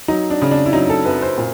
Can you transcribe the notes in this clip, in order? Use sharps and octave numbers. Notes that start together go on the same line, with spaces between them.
F#3 D#4
D4
C#3
D4
E4
F#3 D#4
A4
F#2 B4
C5
A#2